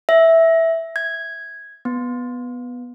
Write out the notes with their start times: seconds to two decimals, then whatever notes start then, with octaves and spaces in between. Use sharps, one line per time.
0.09 E5
0.96 G#6
1.85 B3